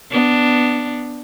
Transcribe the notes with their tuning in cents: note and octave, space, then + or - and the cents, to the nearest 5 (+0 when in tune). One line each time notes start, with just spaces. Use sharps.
B3 +0 D4 +0